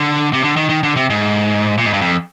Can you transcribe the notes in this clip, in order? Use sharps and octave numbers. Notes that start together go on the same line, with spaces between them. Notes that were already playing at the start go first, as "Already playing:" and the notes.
Already playing: D3
C3
D3
D#3
D#3
D3
C3
G#2
A#2
G#2
G2
F2